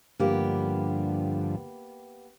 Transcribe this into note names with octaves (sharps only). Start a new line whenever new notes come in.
G2 D3 F3 A#3 B3 G4